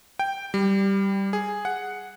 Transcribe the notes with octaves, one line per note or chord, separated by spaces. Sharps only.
G5
G3
G#4
F#5